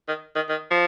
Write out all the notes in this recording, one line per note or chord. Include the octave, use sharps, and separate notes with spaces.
D#3
D#3
D#3
F3